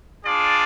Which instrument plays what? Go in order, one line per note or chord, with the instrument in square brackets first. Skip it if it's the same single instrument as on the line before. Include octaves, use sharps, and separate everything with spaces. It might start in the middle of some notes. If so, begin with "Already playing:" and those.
[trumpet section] D4 F4 G#4 D5